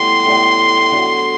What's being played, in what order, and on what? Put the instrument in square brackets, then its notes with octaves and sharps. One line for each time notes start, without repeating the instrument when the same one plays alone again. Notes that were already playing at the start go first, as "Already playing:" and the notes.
Already playing: [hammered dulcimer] A2 G3 B3 [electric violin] C6
[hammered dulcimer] A2 G3 B3
D3 F#3 B3